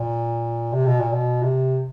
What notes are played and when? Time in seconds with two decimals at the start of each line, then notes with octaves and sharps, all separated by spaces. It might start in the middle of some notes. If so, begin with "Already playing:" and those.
Already playing: A#2
0.73 C3
0.86 B2
1.00 A#2
1.13 B2
1.42 C3